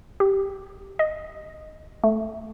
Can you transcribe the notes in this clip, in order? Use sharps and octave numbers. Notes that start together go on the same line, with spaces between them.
G4
D#5
A3